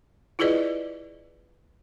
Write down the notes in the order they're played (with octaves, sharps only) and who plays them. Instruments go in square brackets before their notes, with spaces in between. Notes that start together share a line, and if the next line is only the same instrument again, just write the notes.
[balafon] E4 F4 G#4 B4 D5 D#5